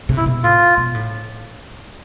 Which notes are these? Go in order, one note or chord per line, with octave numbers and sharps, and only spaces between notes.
C3
E4
B2
A2 F4
B2
A2